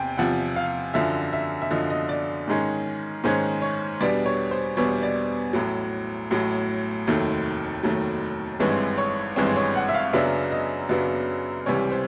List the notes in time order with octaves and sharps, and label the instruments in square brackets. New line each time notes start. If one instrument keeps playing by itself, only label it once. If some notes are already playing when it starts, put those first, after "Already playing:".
Already playing: [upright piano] E2 C3 G5 G#5
E2 C3 F3 F#5
F5
F#2 D3 F3 E5
E5
E5
F#2 D3 F3 D#5
D#5
D5
G#2 D#3 G#3 C#4
G#2 D#3 G#3 C#4 C5
C#5
E2 B2 G3 B3 D4 D5
C#5
C5
E2 B2 G3 B3 D4 C#5
D5
A1 A2 F#3
A1 A2 F#3
F1 D#2 D#3 F#3 A3
F1 D#2 D#3 F#3 A3
G#1 G2 E3 G#3 C4 C#5
C#5
G#1 G2 E3 G#3 C4 C#5
C#5
F#5
E5
F5
F#2 C#3 F#3 B3 D4 E5
D#5
F#2 C#3 F#3 B3 D4
C#2 C3 E3 G3 C#5
C5